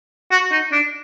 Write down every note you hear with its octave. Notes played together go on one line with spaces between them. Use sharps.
F#4
D#4
D4